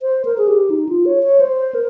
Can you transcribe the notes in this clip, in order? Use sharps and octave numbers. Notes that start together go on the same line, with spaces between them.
C5
A#4
G#4
G4
D#4
F4
C#5
C#5
C5
A#4